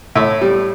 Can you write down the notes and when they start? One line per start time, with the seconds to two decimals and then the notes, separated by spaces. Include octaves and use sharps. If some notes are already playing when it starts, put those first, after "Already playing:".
0.15 A2 E5
0.41 G3